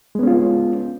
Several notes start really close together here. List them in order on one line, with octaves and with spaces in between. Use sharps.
G#3 B3 C#4 F4